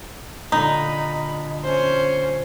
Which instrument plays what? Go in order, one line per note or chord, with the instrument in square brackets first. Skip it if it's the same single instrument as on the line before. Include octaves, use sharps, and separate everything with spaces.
[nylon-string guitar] A#2 D3 [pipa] D#4 [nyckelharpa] B5
[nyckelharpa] C#4 C5